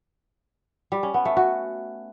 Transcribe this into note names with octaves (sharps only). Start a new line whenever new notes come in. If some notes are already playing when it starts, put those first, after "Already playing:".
G3
C#4
B3
A3
F#4